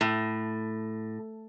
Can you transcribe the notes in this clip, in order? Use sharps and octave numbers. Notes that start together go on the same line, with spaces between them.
A2